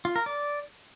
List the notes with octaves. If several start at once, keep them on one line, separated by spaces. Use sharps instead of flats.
F4
A#4
D5